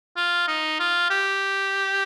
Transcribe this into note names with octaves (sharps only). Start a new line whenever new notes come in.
F4
D#4
F4
G4